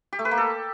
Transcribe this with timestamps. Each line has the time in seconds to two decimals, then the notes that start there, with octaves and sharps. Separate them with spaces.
0.13 G4
0.19 A3
0.25 B4
0.31 A#3
0.38 A4